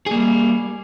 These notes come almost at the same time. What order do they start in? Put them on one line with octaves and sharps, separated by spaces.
G#4 A#3 G3